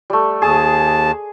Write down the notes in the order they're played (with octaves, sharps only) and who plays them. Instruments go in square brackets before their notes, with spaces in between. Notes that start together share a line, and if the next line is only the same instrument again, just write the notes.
[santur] G3 A3
[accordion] D#2 A5 [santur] G#4 D#6